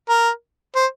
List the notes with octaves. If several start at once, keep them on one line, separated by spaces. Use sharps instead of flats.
A#4
C5